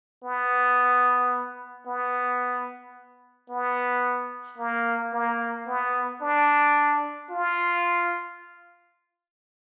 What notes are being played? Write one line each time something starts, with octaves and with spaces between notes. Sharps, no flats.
B3
B3
B3
A#3
A#3
B3
D4
F4